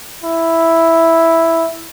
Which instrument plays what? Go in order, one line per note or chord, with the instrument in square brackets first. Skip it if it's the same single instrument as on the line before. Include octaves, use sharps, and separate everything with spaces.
[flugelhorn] E4